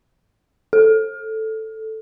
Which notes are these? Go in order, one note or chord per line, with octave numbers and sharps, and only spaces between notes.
A4